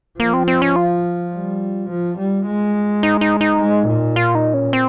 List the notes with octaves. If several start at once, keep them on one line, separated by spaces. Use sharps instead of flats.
F3 A#3
C4
C4
C#4
F4
G3
F3
G3
G#3
D#4
D#4
D#4
G#3
A#2
F4
D#4
C#4
C4